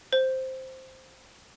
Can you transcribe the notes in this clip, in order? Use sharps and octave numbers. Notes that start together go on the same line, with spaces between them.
C5